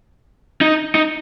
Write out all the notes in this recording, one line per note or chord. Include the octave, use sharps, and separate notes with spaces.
D#4
D#4